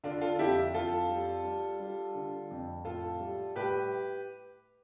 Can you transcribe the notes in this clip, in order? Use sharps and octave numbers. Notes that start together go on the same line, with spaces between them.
D3 D4 F4
F4 A4
F2 E4 G4
F2 F4 A4
G3
G3
G3
D3
F2
A2 F4 A4
G3
A2 G4 B4